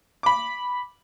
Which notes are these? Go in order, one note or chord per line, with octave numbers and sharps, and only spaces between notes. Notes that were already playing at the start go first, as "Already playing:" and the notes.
B5 D6